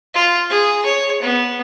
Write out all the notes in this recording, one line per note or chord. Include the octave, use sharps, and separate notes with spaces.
F4
G#4
C#5
B3